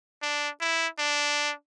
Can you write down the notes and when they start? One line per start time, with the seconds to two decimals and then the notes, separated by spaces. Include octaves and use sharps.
0.22 D4
0.60 E4
0.99 D4